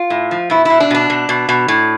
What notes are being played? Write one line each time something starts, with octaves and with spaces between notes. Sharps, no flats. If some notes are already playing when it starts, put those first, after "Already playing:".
Already playing: F4
A2
F3
B2 E4
B2 E4
D4
B2 D4
B2
B2
B2
A2